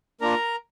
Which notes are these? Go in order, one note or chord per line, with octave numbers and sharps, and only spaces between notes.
A#3 D4 F4 A#4 A#5